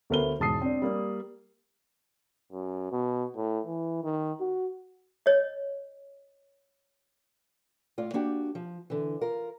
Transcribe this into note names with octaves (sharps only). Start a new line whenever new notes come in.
D2 A3 B3 A#4 C5 G7
E1 G#2 A5 D#6 C7
C4 D4
G3 A#3
F#2
B2
A2
E3
D#3
F#4
C#5 D#5
A2 F4 D5
A#3 D4 F#4 G4
F3
D3 E3
F4 A#4